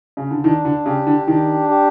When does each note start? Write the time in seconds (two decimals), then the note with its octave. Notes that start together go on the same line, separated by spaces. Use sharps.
0.17 C#3
0.31 D3
0.44 D#3 D4
0.65 D3
0.86 C#3 G4
1.07 D3
1.27 D#3 D4
1.69 G4